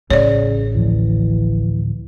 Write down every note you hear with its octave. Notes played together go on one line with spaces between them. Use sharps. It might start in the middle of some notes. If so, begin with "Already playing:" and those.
A1 C#3 C#5 D5
D2 A2 E3 F3